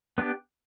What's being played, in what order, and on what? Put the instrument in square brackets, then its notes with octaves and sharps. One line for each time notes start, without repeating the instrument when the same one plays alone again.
[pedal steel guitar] B3 D4 G4